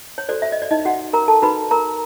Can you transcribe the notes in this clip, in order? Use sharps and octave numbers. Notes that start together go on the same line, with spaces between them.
C#5
F#4 A4 C5 D5
E5
D#5
D5
D#4 D#5
F#4 F#5
A#4 A#5
A4 A5
D#4 F#4 B4 B5
A#4 A#5